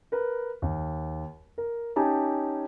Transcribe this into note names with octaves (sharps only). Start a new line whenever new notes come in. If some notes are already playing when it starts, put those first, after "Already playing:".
A#4 B4
D#2
A#4
C#4 D#4 G4 G#5 A5